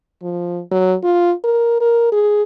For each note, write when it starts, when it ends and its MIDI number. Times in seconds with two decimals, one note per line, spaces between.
0.23 0.62 53
0.72 0.96 54
1.04 1.33 65
1.44 1.79 70
1.81 2.08 70
2.12 2.43 68